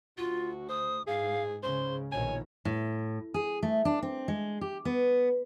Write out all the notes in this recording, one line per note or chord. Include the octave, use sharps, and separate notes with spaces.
D2 F4 F#4
C5 D#6
G#2 G#4 F5
C#2 G#2 C#3 C5 C6
A#1 B2 D#3 C#5 G#5
A2
G#4
A3
D4
C4
G#3
G4
B3